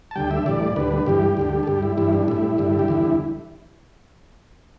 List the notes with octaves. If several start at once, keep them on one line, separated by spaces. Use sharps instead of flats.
A5
D2 D3 G3 G5
E5
A2 E3 G3 D5
D2 D3 G3 B4
G2 E3 G3 G4
D2 D3 G3
A4
G2 G3 G4
E4
G2 E3 G3 E4
D4
A2 G3 E4
G2 D3 G3
G4
E2 D3 G3 E4